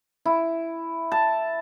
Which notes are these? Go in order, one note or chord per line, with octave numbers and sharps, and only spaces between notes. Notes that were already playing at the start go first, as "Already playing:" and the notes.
E4
A5